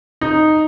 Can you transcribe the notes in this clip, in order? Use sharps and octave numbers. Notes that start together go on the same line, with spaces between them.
D#4